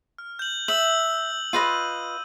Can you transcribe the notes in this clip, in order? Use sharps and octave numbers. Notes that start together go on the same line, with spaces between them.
F6
G6 F#7
E5 E6 F#7
F4 B4 D#5 D#7